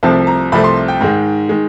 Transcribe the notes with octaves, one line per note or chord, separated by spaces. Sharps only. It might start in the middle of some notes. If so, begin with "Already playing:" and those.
C2 C3 F3 A3 C4 A5
A#5
C2 C3 F3 A3 C4 B5
C6
G5
G#2 D#3 G#3
D#3 G#3